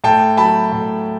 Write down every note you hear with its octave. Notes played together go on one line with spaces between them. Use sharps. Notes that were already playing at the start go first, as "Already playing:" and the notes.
A2 G5 A5
F#3 A5 B5
A2